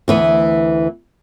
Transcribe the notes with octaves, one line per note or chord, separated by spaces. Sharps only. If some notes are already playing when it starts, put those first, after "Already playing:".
D2 E3 B3